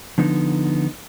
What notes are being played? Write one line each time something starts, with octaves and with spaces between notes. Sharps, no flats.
D3 F3 B3 D#4